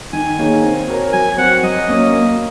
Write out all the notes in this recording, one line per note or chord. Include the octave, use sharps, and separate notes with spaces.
D#3 G#5
A#3 D#4 G#4 C#5
C4
F#4 A#4 C#5
F#3 G#5
C4 F#4 F#5
F#3 D#5
A#3 C#4
A#3